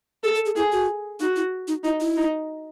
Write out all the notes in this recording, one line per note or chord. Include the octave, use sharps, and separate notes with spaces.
G#4 A4
A4
G#4
E4 G#4
F#4
D#4 F#4
E4
D#4
D#4 E4
E4
D#4